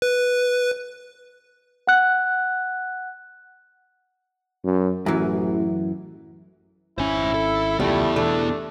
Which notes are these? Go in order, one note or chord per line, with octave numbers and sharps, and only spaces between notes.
B4
F#5 F#6
F#2
A1 F#2 E3
G#1 C#4 E4 C5 G#5
A4
C#2 F3 G3 A3 B3 E4
B2 E3 A3 D4